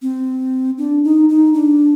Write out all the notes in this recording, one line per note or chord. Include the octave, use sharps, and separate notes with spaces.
C4
D4
D#4
D#4
D4